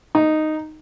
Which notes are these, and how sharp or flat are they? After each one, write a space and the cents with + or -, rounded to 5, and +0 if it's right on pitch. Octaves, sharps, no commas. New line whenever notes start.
D#4 -5